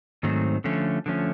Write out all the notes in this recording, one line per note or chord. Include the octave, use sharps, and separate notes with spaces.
G#2 D#3 F#3 A3 C4
D3 F3 A3 C#4
D3 F3 A3 C#4